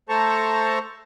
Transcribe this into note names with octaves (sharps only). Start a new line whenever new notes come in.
A3 A4 C5 A5 A#5 C#6